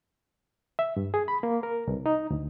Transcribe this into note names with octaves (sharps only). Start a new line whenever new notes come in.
E5
G2
G#4
B5
A#3
A#4
C2
D#4
D2